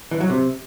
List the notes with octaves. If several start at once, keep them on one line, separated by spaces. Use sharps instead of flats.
E3
F#3
C3